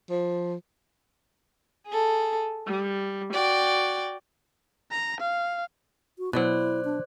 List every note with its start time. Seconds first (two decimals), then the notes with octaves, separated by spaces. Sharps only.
0.10 F3
1.87 G#4 A4
2.67 G3
3.33 F#4 D5 G5
4.91 A#5
5.20 F5
6.18 F#4
6.33 B2 F#3 E4 C5 D5 F#6
6.84 D4